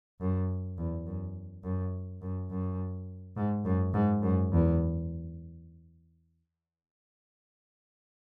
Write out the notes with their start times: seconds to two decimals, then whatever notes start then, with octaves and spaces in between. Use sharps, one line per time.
0.20 F#2
0.78 E2
1.06 F#2
1.64 F#2
2.22 F#2
2.51 F#2
3.37 G#2
3.65 F#2
3.94 G#2
4.22 F#2
4.52 E2